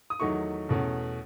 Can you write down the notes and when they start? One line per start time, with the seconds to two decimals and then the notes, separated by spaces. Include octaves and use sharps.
0.10 D#6
0.20 E2 D#3 F#3 A3 D#4 C#6
0.69 E2 B2 A3 C#4